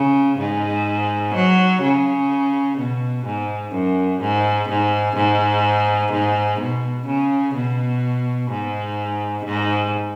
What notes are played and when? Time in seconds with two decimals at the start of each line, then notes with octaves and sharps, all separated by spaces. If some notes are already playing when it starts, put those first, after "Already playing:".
Already playing: C#3
0.39 G#2
1.35 F#3
1.82 C#3
2.78 B2
3.26 G#2
3.73 F#2
4.21 G#2
4.69 G#2
5.16 G#2
6.12 G#2
6.60 B2
7.07 C#3
7.55 B2
8.51 G#2
9.45 G#2